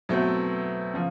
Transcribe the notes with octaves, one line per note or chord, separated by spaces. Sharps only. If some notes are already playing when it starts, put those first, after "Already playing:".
B2 F#3 A3 C4 E4
C#3 F3